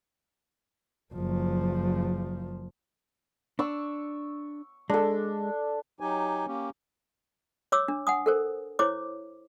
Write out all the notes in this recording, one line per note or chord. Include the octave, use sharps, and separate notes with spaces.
F#1 F3
D4 C#6 E6
G#3 D4 A4
F#3 D#4 G4 G#5
A#3 C#4 G4
C#5 D6 E6
D4
F#5 G#5 D#6
A4 A#4 C5
E4 C5 C#5 D6